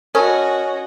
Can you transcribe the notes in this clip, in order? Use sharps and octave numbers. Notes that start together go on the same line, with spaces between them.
C#4 F#4 A#4 D#5 A5 B5